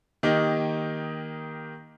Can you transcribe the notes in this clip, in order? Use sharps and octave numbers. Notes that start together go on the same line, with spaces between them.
D#3 A#3 D#4 G4